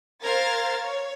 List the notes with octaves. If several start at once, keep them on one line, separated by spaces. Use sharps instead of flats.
A#4 C5 F5 F6 G#6 A6
C#5